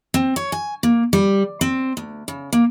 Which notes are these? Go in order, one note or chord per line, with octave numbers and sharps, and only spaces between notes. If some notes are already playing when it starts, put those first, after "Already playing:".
C4
C#5
G#5
A#3
G3
C4
D2
C#3
A#3